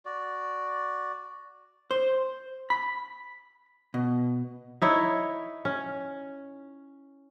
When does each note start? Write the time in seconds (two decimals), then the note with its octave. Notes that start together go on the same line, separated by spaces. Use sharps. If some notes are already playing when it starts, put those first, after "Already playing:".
0.05 F#4 D5
1.91 C5
2.70 B5
3.94 B2
4.82 D#4 E4 C#5
5.65 C#4